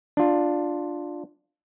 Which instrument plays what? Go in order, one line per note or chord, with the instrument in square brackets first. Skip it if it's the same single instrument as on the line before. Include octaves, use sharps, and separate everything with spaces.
[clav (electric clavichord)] D4 F4